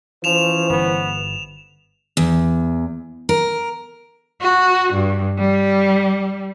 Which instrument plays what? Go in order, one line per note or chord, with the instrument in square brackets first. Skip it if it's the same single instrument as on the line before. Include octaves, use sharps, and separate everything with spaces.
[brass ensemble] E3 C#4 C5 [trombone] F3 [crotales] E7 F7
[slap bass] G1 [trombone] B3
[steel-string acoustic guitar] E2
A#4
[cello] F#4
G2
G3